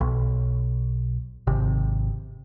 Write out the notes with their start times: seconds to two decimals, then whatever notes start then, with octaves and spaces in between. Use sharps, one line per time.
0.01 B1
1.47 G#1 C3